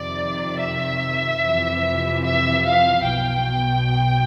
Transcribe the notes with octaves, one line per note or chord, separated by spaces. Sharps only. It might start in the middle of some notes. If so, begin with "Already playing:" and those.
Already playing: F2 C3 D#3 D5
E5
F2 C3 E3
E5
F5
B1 B2 G5